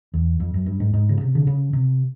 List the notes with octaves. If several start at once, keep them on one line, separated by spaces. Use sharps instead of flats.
E2
F2
F#2
G2
G#2
G#2
C#3
C3
D3
C#3
C3